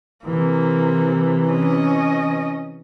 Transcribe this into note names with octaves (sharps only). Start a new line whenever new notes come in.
C3 E3 A#3
C#4 D#5